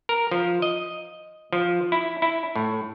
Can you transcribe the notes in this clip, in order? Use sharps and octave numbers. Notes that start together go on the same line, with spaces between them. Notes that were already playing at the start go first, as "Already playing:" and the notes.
A#4
F3
D#5
F3
E4
E4
A2